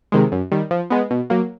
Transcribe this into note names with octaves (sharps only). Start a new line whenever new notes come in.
C3 D#3 G#3
F#2
D#3 G3
F3
G#3 B3
B2
F#3 A#3